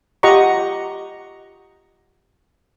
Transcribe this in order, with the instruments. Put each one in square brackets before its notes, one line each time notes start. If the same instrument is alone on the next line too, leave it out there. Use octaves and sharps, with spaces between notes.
[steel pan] F4 G4 D#5 F#5 A#5 C#6